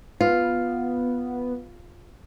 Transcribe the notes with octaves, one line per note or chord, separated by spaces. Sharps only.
B3 F4